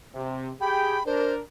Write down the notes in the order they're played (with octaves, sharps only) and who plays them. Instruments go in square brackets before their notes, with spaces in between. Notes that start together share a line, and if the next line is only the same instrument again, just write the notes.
[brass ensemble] C3
[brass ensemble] G4 G#4 G5 [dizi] B5
[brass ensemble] D4 A#4 [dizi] C5